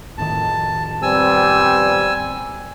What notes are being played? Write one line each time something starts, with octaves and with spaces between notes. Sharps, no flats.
F2 A2 D#3 A5
G3 B3 C4 G#5 E6